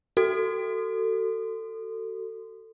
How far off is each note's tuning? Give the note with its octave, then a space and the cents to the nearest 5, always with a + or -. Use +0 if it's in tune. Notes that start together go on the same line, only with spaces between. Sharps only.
F#4 +30 A4 +25